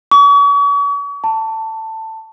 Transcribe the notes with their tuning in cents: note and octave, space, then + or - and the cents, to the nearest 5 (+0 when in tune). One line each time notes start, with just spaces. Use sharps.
C#6 +40
A5 +15